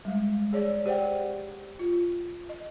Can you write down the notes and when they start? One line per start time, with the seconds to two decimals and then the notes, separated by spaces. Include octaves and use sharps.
0.05 G3 G#3
0.53 G#4 C#5 D5
0.86 G4 C5 D5 F#5 G5
1.79 F4
2.49 D#5